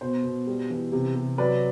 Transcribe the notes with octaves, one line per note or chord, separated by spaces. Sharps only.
B2 C5
B2
G3
E3
C3
C3
F#3 B4 D5